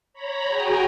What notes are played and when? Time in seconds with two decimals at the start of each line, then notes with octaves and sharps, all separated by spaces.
0.13 C#5 A#5 B5
0.47 F#4 G#4 G5 G#5 A#5